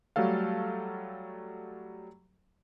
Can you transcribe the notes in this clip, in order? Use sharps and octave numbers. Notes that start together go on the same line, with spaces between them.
F#3 G3 A3 A4 F5